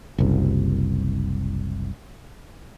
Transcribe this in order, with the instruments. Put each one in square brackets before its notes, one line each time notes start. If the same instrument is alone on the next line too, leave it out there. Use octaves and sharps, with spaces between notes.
[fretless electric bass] F#1 C2